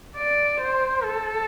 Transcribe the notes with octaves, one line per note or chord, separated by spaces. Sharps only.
D5
C5
A4